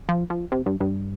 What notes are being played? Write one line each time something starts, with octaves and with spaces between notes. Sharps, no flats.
F3
F3
C3
G2
G2